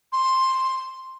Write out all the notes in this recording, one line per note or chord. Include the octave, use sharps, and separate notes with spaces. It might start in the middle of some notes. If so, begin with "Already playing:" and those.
C6